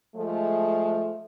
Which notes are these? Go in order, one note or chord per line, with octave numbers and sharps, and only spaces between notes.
F3 G#3 A3